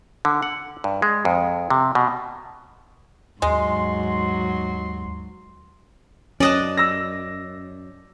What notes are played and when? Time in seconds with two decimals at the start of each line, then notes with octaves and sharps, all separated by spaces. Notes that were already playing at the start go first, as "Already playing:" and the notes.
0.25 D3
0.43 F#5
0.84 G2
1.02 G#3
1.25 F2
1.70 C3
1.95 B2
3.42 D#2 G#2 F#3 G#3 C6
6.40 F#2 C#4 D5 D#5 A5 D#6 F#6
6.77 E6 A#6